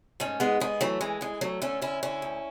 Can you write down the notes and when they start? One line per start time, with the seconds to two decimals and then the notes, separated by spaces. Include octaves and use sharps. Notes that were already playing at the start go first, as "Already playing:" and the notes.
0.20 G#2 A3 C#4
0.40 G#2 G#3 B3
0.60 G#2 G#3 B3
0.81 E3 F#3 A3
1.01 E3 G#3
1.21 E3 G#3
1.41 D2 F#3 A3
1.62 D3 A3 C#4
1.82 D3 C#4 E4
2.03 D3 C#4 E4
2.22 D2